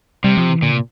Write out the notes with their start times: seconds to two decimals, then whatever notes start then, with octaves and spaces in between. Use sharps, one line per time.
0.24 C3 G3
0.37 F3
0.50 E3
0.62 A#2 D3
0.72 C3